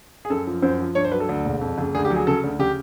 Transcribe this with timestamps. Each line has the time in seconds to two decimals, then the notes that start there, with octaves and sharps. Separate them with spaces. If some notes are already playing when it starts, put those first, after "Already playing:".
0.25 G#4
0.30 F#2 A4
0.47 F3
0.62 F#2 C5
0.79 F3
0.95 G2 C#5
1.05 C5
1.12 F#3 B4
1.20 A4
1.29 D2
1.45 E1
1.61 F2
1.78 F#1
1.95 D2 G#4
2.05 G4
2.10 F#3
2.16 G#4
2.27 C#3 A4
2.44 D2
2.59 C#3 G4